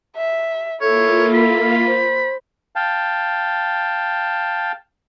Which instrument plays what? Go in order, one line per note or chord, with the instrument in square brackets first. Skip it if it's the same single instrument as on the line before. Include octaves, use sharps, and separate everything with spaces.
[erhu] E5
[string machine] A#3 F4 [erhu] E4 [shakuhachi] A4 [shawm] C#5
[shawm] B5
[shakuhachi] C5
[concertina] F5 G5 A5